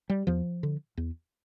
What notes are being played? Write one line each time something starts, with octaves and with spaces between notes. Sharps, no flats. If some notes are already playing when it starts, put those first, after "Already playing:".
G3
E2 F3
D3
E2